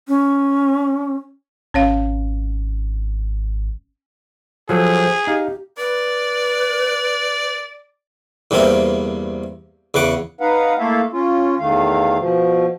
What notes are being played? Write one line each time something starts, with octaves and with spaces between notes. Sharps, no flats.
C#4
G#1 C#4 C#5 F5
F3 F#3 G#4 A4 C5
D#4 G4 F5
B4 D5
E2 G2 C3 A#3 C4
E2 C#3 F#5 D6
D#4 B4 F5 F#5
A3 A#3 E4 A4 E5 F5
C#4 F4
E2 D#3 A3 F5
B2 F3